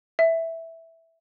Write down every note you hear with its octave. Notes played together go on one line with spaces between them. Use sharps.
E5